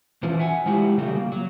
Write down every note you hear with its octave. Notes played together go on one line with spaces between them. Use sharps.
E3 F3 C#4 E4 F#4
E5 F#5 G#5
F3 G#3 E4 F#4 G4
C#3 G3 A3 F#4 G4
A#3
F#3